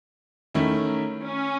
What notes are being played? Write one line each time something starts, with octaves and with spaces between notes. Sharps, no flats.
D#3 A3 C#4 E4
C#4